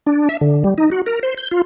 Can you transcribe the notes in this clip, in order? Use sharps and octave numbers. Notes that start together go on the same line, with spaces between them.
D4
E5
D3
G3
D#4
F#4
A#4
C5
G6
F4